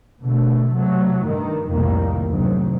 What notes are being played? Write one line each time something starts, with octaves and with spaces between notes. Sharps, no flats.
B2 D3 A3
C3 F#3 A3
G2 D#3
C2 F2 A2 D#3 G3 A#3
D2 G#2 C3 D#3 F#3